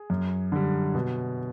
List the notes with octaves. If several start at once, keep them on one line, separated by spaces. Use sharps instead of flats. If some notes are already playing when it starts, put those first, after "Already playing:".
Already playing: G#4
F#2
D3 G3
B2